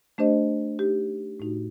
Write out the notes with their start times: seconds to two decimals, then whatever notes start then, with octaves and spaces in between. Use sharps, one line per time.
0.18 A3 D4 G4 C5 D#5
0.79 A3 D#4 G4
1.40 A2 A3 D#4 F#4